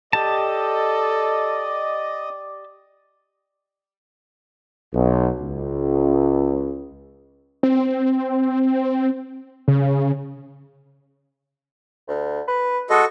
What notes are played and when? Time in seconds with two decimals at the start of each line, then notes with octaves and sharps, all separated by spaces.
0.13 G4 A4 D5 D#5 A5
4.93 B1
5.40 C#2
7.63 C4
9.68 C#3
12.08 D2
12.48 B4
12.90 G#3 F#4 A4 D#5